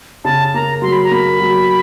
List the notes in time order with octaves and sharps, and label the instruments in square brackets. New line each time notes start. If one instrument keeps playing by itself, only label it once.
[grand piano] C#3 [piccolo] A5
[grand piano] A#3 [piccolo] A#5
[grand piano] F#3 [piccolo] C6
[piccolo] B5
A#5
[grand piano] A#3 [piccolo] B5
[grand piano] F#3